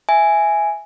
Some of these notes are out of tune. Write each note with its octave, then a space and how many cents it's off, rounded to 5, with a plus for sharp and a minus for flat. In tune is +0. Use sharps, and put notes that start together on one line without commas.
E5 +0 G#5 +0